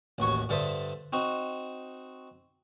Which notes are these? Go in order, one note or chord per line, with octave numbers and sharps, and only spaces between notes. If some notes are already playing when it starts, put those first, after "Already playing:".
A1 D#2 F#4 C#5
G2 D3 A4 C5 E5 D#6
C4 D#4 F#4